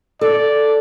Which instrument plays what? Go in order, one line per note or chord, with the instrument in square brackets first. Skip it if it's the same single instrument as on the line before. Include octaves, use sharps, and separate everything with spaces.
[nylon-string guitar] A4 [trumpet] D5